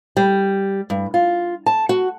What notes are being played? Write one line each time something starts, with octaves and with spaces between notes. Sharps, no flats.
G3
G2
F4
A5
F#4